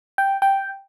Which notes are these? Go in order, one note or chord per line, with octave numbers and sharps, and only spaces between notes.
G5
G5